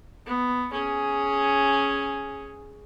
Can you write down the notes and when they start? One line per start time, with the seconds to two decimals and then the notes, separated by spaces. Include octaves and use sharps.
0.27 B3
0.72 C#4 G#4